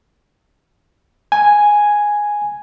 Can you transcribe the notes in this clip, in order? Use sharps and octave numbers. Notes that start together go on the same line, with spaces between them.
G#5